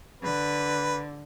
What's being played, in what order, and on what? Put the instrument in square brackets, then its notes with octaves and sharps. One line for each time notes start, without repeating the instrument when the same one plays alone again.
[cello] D3 [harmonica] B4